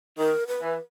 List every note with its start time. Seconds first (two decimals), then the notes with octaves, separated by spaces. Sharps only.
0.18 D#3 A#4
0.47 B4
0.62 E3